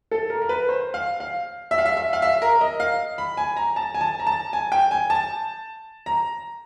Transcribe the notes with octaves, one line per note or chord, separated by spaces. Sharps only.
A4
A#4
A#4
B4
C5
F5
F5
E5
F5
E5
E5
F5
E5
A#4
D#5
F5
B5
G#5
A#5
A5
G#5
A5
A#5
A5
G#5
G5
G#5
A5
A#5